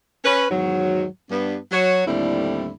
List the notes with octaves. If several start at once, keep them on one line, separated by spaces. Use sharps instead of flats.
C#4 B4
E2 G#2 D#3 F#3
G2 B3 D4
F#3 F#4 C#5
D#2 A2 D3 G3 C4 E4